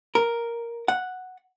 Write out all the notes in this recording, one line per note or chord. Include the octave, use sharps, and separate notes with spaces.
A#4
F#5